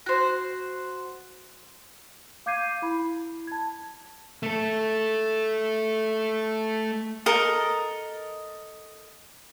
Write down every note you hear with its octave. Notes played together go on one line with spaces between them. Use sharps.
F#4 C5
F5 D6 G6 G#6 C7 D#7
E4 B5
A5 G#6
A3 A4
A4 A#4 D#5